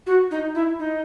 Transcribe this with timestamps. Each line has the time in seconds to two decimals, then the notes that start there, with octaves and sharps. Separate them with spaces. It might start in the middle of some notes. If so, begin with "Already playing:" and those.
0.07 F#4
0.31 D#4
0.55 E4
0.79 D#4